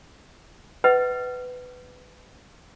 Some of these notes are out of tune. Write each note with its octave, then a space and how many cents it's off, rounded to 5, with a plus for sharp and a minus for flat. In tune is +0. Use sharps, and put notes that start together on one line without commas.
B4 +15 D#5 +45 F#5 +30